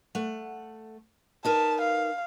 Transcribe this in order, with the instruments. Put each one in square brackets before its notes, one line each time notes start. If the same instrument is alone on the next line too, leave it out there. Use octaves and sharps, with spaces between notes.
[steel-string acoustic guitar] A3 F#5
[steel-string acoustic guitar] D#4 A#4 B4 [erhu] A5
[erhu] F5